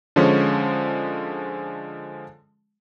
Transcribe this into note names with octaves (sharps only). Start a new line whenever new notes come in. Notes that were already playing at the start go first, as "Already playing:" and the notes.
D3 F3 G#3 C#4